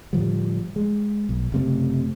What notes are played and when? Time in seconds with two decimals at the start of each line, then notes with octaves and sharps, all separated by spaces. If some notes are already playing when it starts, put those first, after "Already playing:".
0.13 A2 D3 F3 G3
0.76 G#3
1.29 B1
1.52 F#1 C3 A3